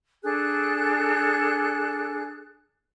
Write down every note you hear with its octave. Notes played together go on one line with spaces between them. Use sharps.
D4 G#4 A4 F#6